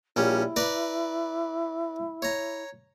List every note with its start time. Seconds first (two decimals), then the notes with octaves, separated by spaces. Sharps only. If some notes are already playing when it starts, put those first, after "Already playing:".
0.16 A#1 G3 C#4 E4
0.56 B4 D5 A#5
2.22 C#5 A#5